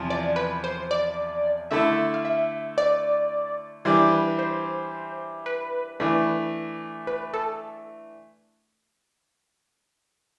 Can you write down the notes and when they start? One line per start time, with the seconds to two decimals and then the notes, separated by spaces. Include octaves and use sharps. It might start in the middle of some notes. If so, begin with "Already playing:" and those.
Already playing: E2 C3 F3
0.10 D5
0.36 B4
0.64 C5
0.91 D5
1.71 D3 A3 E4 A4 E5
2.14 F5
2.25 E5
2.78 D5
3.85 E3 G3 D4 C5
4.12 B4
4.39 C5
5.46 B4
6.00 E3 A3 D4 B4
7.07 B4
7.33 A4